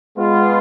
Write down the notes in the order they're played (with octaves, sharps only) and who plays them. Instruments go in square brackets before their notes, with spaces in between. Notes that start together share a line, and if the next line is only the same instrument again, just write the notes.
[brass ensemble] G#3 B3 F4